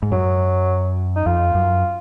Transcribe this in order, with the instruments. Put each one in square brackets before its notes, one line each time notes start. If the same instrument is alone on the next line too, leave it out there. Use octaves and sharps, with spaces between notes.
[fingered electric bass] G#2
[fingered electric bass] F#2 [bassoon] F#3
[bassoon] D#4
[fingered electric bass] F2 [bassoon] F4
[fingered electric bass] F#2